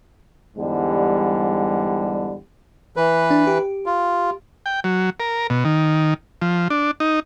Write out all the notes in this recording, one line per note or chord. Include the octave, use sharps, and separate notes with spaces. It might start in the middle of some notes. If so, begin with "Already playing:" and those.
E2 G#2 D3 G3
E3 B4
D4
G4
F4
G5
F#3
A#4
B2
D#3
F3
D4
D#4